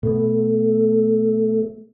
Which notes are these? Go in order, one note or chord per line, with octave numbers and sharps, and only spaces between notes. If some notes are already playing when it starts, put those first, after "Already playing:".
B2 A3 B3